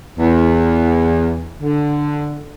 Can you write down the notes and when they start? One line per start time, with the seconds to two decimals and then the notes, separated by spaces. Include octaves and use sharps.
0.18 E2
1.61 D3